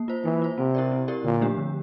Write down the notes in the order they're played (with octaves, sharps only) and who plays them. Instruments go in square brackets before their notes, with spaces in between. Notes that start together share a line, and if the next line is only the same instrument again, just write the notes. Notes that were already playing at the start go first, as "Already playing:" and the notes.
Already playing: [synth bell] A#3
F4 C5
[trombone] E3 [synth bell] A#3
[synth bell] F4 C5
[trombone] C3 [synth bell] C4
[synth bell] E4 G4 A#4 D5
C4
E4 G4 A#4 D5
[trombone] A#2 [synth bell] D3
[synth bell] F3 A3 D4 G4
D3